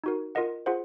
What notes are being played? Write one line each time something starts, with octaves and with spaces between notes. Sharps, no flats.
D#4 F#4 A#4
F4 A#4 D#5 F#5
F4 G#4 C5 F#5